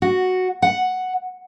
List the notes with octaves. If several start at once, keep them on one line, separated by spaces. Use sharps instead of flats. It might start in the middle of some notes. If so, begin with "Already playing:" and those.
F#4
F#5